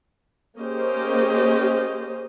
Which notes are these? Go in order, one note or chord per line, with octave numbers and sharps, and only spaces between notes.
A#3 C#4 G4 G#4 C5 D#5